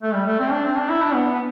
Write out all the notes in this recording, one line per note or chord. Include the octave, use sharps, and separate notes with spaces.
A3
G3
A3
C4
D4
C4
D4
E4
D4
B3
B3